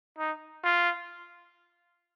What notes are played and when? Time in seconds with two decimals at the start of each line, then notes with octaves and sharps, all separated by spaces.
0.18 D#4
0.64 F4